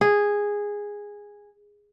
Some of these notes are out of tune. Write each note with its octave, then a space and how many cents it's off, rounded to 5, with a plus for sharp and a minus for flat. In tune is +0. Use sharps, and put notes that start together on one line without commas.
G#4 -10